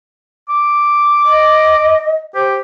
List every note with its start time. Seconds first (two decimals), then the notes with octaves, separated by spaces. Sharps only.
0.49 D6
1.24 D#5
2.35 G4 C5